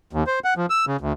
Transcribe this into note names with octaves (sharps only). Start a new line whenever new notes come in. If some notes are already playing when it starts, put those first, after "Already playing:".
D#2
C5
F#5
F3
E6
C#3
D2